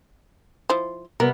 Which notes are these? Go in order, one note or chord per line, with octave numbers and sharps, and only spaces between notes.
F3 E4 C5
C3 G3 B3 A#4